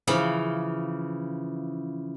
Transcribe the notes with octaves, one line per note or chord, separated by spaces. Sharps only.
C#3 E3 F3